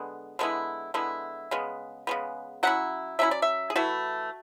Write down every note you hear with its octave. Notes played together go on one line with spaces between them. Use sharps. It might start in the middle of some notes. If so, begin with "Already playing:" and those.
Already playing: D3 G#3 B3
D3 G#3 B3 E4
D3 G#3 B3 E4
C#3 G#3 B3
C#3 G#3 B3
F#3 C#4 E4 F#5
F#3 C#4 E4 E5
D5
E5
G#4
E3 A3 E4 F#4